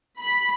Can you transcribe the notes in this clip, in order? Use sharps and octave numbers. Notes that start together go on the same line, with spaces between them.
B5